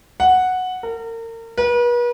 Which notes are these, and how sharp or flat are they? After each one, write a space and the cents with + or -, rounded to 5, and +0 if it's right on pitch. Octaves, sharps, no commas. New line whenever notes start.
F#5 -5
A#4 -35
B4 -40